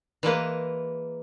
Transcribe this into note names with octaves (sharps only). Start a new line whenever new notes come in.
E3 G#3 A#3 B4